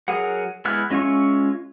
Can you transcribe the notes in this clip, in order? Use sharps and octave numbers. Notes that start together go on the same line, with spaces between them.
F#3 G#4 A#4 F#5
G#3 B3 E4 F6 F#6
G#3 C#4 F4 E5 C#6